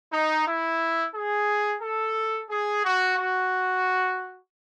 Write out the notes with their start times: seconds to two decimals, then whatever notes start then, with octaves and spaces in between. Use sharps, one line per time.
0.12 D#4
0.46 E4
1.14 G#4
1.82 A4
2.50 G#4
2.84 F#4
3.17 F#4